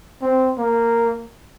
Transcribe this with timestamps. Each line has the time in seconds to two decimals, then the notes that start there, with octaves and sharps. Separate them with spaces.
0.22 C4
0.58 A#3